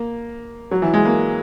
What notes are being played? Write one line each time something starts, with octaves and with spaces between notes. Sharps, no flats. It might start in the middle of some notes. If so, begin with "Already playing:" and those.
Already playing: A#3
F#3
E3
G#3
A#3